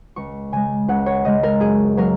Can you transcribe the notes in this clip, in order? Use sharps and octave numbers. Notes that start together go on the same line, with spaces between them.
C#2 C#6
C#3 G#3 G#5
C#2 F#5
C#5
C#3 G#3 D#5
A#4
F#2 G#4
F#3 A#3 A#4